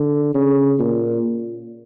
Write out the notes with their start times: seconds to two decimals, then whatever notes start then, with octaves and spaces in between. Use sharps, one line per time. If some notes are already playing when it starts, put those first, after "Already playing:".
Already playing: D3
0.35 C#3
0.79 A#2